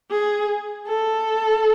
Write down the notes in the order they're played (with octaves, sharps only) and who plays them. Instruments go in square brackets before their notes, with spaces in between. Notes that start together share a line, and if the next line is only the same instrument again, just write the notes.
[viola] G#4
A4